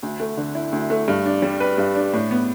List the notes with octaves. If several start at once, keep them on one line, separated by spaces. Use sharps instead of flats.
D2
A3
D3
E4
D2
A3
G2
D4
G3
B4
G2
D4
A2
B3